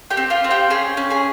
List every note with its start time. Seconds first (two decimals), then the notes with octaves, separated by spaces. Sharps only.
0.10 G4 G5
0.17 C4
0.30 F4 F5
0.44 C4
0.51 G4 G5
0.70 C#4 G#4 G#5
0.97 C#4
1.10 G#4 G#5